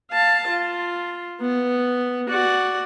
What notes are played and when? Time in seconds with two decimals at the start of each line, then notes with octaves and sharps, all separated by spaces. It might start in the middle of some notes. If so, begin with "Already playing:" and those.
0.11 F5 A5
0.49 F4
1.41 B3
2.30 F#4 D5